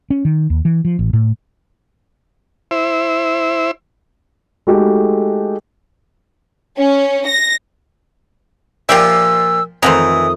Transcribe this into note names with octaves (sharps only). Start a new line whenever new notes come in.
C#4
D#3
D#2
E3
F3
A1
A2
E4 C5 E5
G#3 A3 D#4 F#4 G4 A4
C#4
A#6
A#2 F3 F4 G4 D5 E5 G5 E6
F2 D#3 E3 A3 C5 F#5 A#5 D#6